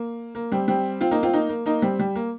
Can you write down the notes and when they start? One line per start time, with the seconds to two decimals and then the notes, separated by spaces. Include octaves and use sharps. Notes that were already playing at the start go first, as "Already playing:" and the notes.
Already playing: A#3
0.35 A#3
0.52 G3 C4
0.68 G3 C4
1.01 C4 F4
1.11 A#3 D#4
1.23 C4 F4
1.33 A#3 D#4
1.49 A#3
1.66 A#3 D#4
1.82 G3 C4
1.99 G3
2.16 A#3